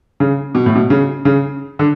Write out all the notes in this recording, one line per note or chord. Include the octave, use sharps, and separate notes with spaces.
C#3
B2
A2
B2
C#3
C#3
D3